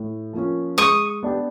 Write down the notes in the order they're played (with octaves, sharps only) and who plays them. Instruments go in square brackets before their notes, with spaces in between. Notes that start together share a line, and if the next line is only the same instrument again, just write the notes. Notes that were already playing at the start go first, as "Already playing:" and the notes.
Already playing: [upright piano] A2
F3 A#3 C#4
[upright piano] G#3 [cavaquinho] C#6 D#6
[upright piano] B3 D4 G4